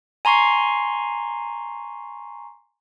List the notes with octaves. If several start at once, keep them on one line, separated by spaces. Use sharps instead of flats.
G#5 A#5 C6 C#6 C7